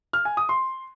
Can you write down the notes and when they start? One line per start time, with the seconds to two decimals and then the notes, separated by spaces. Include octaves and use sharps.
0.13 F6
0.25 G#5
0.37 D#6
0.49 C6